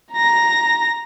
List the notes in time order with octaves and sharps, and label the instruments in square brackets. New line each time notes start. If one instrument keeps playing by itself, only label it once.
[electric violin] A#5 A#6